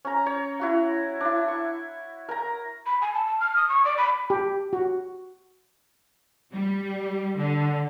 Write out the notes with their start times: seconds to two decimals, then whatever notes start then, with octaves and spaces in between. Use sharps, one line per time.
0.05 C#4 A#5
0.26 C#5
0.60 E4 F#4 F#5
1.21 D4 E4
1.48 C#6
2.29 A#4 A#5
2.86 B5
3.01 G#5
3.13 A5
3.27 A5
3.40 F6
3.56 D#6
3.69 C#6
3.85 D5
3.98 B5
4.30 G4
4.73 F#4
6.53 G3
7.38 D3